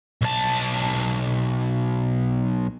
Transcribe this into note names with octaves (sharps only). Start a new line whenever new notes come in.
B1 A5